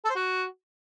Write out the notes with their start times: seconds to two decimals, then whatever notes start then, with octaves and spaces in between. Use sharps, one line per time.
0.05 A4
0.10 C5
0.15 F#4